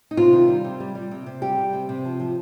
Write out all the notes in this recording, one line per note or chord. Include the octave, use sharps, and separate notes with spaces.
D#4
C3 F4
D#3
G3
C3
G3
G3
C3
C3
G3 G4
G3
C3
C3
F3
F3